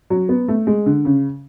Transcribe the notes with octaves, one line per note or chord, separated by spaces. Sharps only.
F#3
B3
A3
G#3
D3
C#3